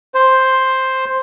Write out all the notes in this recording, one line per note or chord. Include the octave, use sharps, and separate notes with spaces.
C5